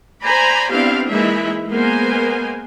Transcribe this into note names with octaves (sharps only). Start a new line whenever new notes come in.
C5 D5 G#5 A#5 B5
B3 C4 D4 E4 G4 F5
E3 G#3 A#3 D#4 E4 E5
G#3 A#3 B3 A#4 C5 G#5